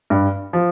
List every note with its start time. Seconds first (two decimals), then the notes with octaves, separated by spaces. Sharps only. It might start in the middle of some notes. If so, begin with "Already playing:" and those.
0.10 G2
0.53 F3